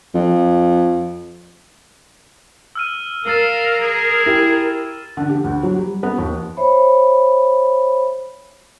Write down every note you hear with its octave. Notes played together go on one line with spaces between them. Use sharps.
F2
E6 F6 D#7
A#4 F5 E6 A6 E7
G#4
E4 G4
D3
G4
D2
F#3
G3
B3
D#2
C5 C#5 E5 B5